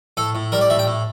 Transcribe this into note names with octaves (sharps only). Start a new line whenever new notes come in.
A2 A4
A2
G3 A#4
D5
A2 E5
G5
A2